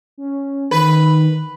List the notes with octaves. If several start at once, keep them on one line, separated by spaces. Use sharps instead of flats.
C#4
D#3 B4